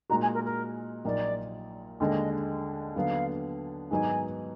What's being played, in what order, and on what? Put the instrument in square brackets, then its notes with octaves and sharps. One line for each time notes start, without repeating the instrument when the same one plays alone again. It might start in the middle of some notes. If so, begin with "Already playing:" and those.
[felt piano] A#2 G#3 D#4 F#4 [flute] A#5
[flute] G#5
A#4
A#4
[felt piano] A#1 A#2 F#3 A#3 D#4 [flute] D5
[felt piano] D#2 D3 G#3 [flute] D#5
[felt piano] D#2 D3 F#3 B3 [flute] F5
[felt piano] G#2 D#3 F#3 B3 D#4 [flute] G#5